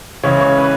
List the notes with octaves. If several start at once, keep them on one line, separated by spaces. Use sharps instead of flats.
C#2 C#3 E3 C#5
C#5
B4